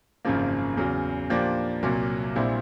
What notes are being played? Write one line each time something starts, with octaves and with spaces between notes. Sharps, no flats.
G#1 F#2 C#3 F3 A#3
E2 C#3 F#3
A#2 F3 A#3 D4 G4
C2 A#2 F#3 A#3
A#1 A#2 G3 C4 E4